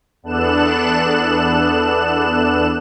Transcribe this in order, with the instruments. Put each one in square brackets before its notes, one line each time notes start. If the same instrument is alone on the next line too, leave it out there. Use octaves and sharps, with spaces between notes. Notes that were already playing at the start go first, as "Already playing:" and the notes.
[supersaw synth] E2 B3 D4 A4 F#6 E7